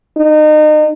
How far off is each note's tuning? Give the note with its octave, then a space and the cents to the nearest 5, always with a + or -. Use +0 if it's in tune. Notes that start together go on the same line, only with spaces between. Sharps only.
D#4 -30